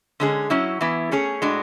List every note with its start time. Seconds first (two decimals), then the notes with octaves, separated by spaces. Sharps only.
0.20 D3 G#3 C#4 G#4
0.50 F#3 C#4 E4
0.81 E3 B3 E4
1.11 A3 C#4 G#4 C#5
1.42 A2 G#3 D4 F#4